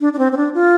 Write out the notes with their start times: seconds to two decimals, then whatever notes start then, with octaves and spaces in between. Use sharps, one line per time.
0.01 D4
0.13 D4
0.19 C4
0.32 C4
0.37 D4
0.54 F4